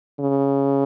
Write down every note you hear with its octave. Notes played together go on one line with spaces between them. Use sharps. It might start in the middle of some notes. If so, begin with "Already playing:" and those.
C#3